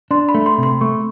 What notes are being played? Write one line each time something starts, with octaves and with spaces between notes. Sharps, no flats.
D4 C6
B5
A3
C6
C3
C6
A3 C#6